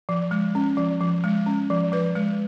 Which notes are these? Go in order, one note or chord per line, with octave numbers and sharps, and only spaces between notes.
F3
G#3
C#4
F3
F3
G#3
C#4
F3
F3 B4
G#3